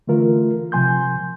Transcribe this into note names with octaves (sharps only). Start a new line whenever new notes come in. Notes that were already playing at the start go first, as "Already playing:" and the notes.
D3 E3 A3 F4 A#4
C3 F3 G#5 C6 G6